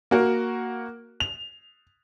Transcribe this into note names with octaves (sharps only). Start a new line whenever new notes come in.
A#3 F#4 A#4
F7